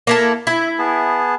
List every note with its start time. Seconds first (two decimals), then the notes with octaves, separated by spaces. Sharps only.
0.07 A#3 E4 A4
0.47 E4 E5
0.79 B3 G#4 A5